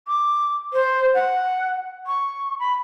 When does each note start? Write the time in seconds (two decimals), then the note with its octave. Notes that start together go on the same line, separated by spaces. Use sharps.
0.07 D6
0.73 C5
1.14 F#5
2.07 C#6
2.59 B5